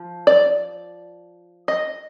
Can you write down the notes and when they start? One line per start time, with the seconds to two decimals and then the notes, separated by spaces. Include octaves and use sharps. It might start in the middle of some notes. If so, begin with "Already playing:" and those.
Already playing: F3
0.27 D5
1.68 D#5